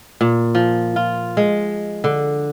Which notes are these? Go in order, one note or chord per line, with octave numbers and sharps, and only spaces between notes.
A#2
F3
F4
G#3
D3